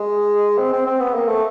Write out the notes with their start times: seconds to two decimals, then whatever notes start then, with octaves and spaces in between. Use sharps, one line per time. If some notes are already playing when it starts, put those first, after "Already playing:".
Already playing: G#3
0.58 C4
0.73 C4
0.86 C4
1.00 B3
1.14 A#3
1.28 A3